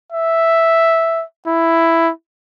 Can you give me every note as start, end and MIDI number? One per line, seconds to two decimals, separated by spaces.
0.13 1.24 76
1.47 2.11 64